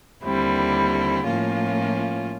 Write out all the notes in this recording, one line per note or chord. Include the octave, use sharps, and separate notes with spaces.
D#2 D3 G3 C4 E4
A2 F3 A#3 C#4 F4